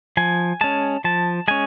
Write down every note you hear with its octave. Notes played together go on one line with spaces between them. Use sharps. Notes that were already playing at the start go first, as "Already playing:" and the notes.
F3 G#5
G#3 C#4 A5
F3 A5
G#3 C#4 G#5